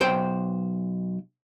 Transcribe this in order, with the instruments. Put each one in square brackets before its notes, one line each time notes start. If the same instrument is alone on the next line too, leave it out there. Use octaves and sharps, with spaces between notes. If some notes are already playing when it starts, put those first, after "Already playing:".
[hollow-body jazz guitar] B1 C5 G5